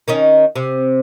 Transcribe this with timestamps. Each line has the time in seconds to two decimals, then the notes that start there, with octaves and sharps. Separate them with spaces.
0.08 D#3 C#4 D#4
0.56 C3